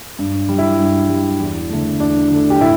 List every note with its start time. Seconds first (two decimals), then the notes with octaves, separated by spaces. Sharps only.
0.19 G2
0.49 G3
0.58 E4
0.79 G2
1.09 G3
1.40 E2
1.70 D3 A3
2.00 E2 D4
2.31 D3 A3
2.50 G4
2.61 A2 E4